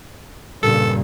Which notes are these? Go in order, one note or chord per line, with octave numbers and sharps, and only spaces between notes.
G2 A#2 C#3 A4